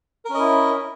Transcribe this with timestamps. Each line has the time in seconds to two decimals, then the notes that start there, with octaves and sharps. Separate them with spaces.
0.25 A#4
0.30 C#4
0.34 D#5
0.39 E4